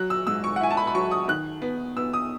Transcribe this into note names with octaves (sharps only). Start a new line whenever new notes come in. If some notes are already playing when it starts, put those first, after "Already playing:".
Already playing: F#3 F#6
E6
G#2 E6
C#6
F#5
E4 G#5
A5
B5
B5
F#3 C#6
D#6
D#3 F#6
B3
B3 E6
D#6